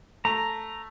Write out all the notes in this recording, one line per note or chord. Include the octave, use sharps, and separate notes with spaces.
A3 A#5